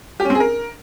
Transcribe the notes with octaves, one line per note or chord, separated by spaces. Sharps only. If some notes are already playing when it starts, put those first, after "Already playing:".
G4
C#4
C4
G#4
A#4